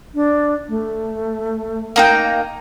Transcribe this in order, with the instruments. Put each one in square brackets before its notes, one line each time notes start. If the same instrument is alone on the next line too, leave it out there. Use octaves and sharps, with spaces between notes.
[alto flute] D4
A3
[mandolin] A#3 D#4 G5